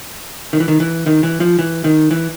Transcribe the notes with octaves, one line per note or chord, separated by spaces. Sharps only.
D#3
E3
D#3
E3
D#3
E3
F3
E3
D#3
E3